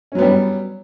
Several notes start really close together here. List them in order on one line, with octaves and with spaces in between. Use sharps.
C#4 F#3 B3 G3